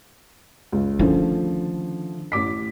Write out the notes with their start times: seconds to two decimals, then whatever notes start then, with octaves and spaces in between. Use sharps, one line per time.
0.72 C#2
0.99 D3 D#3 F3 A3 C#4
2.32 A1 D6 B6